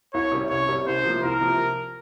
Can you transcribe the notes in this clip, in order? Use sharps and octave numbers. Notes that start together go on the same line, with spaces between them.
C2 C#5
C3 G3 C#4
C2 C#5
C3 G3 C#4
C2 C5
C3 F3 A#3
C2 A#4
C3 F3 A#3